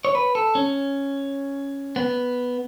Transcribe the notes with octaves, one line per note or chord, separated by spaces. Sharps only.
C#5
B4
A4
C#4
B3